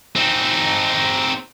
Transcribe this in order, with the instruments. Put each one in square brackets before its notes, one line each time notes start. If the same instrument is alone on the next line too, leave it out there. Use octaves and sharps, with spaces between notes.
[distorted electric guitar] C4 D#4